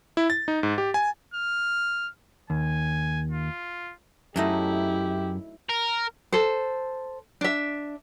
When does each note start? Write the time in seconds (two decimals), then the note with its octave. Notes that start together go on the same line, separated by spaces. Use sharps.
0.17 E4
0.30 A6
0.48 D#4
0.63 G#2
0.78 G4
0.94 G#5
1.34 F6
2.50 D#2 G#5
3.31 F4
4.36 F#2 F#3 A3 D#4 E4 G4
5.70 A#4
6.32 A4 C5
7.41 D4 E5